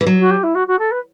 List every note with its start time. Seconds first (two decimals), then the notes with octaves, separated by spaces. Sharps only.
0.01 E3
0.06 F#3
0.19 F#4
0.30 G4
0.43 E4
0.54 F#4
0.67 F#4
0.78 A4
0.91 B4